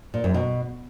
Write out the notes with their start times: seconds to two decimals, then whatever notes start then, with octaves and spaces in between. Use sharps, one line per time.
0.14 A#2
0.24 F#2
0.34 B2